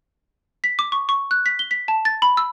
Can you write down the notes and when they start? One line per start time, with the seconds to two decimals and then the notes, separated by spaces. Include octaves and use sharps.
0.64 B6
0.79 D6
0.92 C#6
1.09 C#6
1.31 F#6
1.46 B6
1.59 G7
1.71 B6
1.88 A5
2.05 A6
2.22 B5
2.37 E6